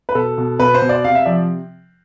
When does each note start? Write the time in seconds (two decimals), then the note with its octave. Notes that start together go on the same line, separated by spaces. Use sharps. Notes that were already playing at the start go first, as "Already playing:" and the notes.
0.09 B4
0.15 B2 A4
0.38 B2
0.59 B2 B4
0.74 C5
0.82 B2
0.89 D5
1.04 C3 F5
1.15 E5
1.26 F3 D5